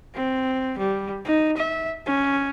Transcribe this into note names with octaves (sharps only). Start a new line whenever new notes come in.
C4
G3
D#4
E5
C#4